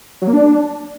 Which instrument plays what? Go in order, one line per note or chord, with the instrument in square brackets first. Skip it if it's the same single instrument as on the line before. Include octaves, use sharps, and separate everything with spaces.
[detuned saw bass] F#3
A#3
D4